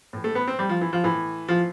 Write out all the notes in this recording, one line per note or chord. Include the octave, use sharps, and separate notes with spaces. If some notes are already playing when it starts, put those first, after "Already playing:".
A2 E3
A3
B3
C4
G3
F3
E3
F3
A2 E3
F3